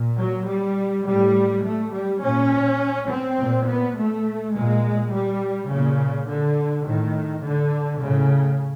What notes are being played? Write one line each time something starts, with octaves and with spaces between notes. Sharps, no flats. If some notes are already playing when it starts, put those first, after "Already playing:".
Already playing: A#2
F#3
G3
A2 G3
A3
G3
A#2 C#4
C4
A#2
B3
A3
A#2 G#3
G3
A#2 C#3
D3
A2 D#3
D3
A2 C#3